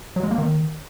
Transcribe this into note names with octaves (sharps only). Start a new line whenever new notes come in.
F#3
G#3
A#3
D#3